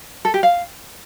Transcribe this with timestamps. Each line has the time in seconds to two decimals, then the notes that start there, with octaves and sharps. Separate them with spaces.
0.25 A4
0.34 G4
0.43 F5